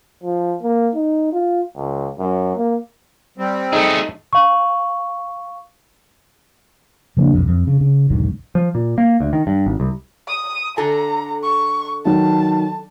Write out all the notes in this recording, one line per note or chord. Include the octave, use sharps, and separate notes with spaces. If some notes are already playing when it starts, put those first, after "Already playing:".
F3
A#3
D#4
F4
C#2
F#2
A#3
G3 C4
A3 D#4 G#4 A4
F5 C#6
C#3 F3 A#3 D4
B1 F2
F2
C#3
C#3
B1 E2 G#2 D#3
F3
A#2
A#3
D2
D#3
G2
G#1
C2
D#6
D3 A4 G#5 A#5
C#6
D#3 F#3 A5